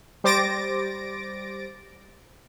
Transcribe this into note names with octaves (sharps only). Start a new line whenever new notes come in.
G3 C5 D6 A6 A#6 D7